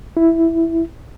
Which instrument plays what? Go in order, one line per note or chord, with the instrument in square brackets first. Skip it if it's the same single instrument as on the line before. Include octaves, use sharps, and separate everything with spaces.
[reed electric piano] E4